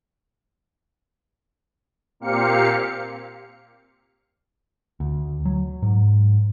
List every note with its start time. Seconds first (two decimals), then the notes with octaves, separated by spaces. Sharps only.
2.20 A#2 A#3 C4 G4 F5 C#7
5.00 D2
5.45 F#3
5.82 G#2